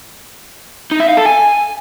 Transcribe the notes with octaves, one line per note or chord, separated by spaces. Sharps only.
D#4
E5
F5
A4
G#5